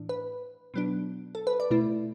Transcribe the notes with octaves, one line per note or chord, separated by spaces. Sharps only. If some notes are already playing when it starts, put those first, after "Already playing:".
Already playing: A2 E3 D4
B4
B2 F#3 B3 D4
A4
B4
D5
B2 A3 E4